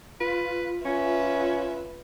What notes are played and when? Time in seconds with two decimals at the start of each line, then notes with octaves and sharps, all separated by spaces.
0.20 F4 B4
0.85 C#4 B4 E5